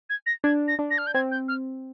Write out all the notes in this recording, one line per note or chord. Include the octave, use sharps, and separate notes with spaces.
G#6
A#6
D4 G#6
A#6
D4
A#6
F6
G6
C4 G#6
G6
F6